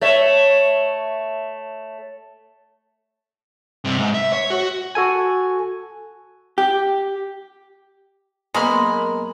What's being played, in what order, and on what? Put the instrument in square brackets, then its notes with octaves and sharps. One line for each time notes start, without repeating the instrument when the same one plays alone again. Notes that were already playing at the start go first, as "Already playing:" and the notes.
[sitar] A3 C#5 E5
[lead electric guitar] G2 C3
G#2
E5
C#5
F#4
[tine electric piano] F#4 A4 G#5
[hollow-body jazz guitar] G4
[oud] F#2 A#3 B3 [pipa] G#3 [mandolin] A#5 B5 F6